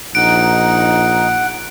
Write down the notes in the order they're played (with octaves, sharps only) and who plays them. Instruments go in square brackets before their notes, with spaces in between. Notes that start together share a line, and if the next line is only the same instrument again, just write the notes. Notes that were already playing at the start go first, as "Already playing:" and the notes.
[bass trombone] A#1 [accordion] D#4 [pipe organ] F#5 [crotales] D7